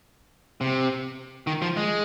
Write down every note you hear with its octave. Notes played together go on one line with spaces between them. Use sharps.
C3
D#3
F3
G#3